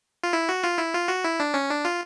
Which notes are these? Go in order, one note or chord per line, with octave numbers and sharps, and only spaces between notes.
F4
E4
F#4
F4
E4
F4
F#4
E4
D4
C#4
D4
F4